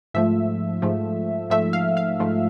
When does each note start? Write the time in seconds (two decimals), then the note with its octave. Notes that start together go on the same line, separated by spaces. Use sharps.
0.14 G#2 F3 A3 E5
0.82 G#2 F3 A3
1.50 G#2 F3 A3 E5
1.73 F5
1.97 F5
2.20 G#2 F3 A3